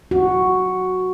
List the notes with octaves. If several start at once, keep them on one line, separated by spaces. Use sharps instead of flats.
F#4